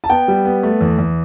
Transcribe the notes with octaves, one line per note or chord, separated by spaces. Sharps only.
A5
B3 G5
G3
B3
A3
E2
E2